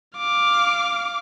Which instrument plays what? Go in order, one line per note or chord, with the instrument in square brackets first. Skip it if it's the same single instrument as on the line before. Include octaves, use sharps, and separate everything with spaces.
[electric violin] F5 D6